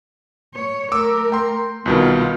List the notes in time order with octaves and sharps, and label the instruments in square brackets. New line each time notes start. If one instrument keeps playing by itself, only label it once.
[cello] C#5
[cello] A3 A#4 [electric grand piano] D6 E6
[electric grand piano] G5 C6
[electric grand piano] C2 B2 D#3 [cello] B3 F4